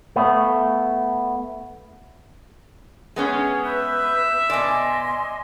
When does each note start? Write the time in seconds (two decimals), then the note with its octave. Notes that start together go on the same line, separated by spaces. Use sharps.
0.16 A3 B3
3.16 G#3 B3 C#4 G#4
3.64 B4 E5 G6
4.50 B2 D5 D#5 G#5 C6